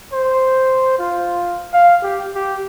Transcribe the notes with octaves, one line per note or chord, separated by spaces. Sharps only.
C5
F4
F5
G4
G4